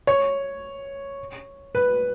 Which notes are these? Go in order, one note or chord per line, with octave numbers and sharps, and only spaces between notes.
C#5
B4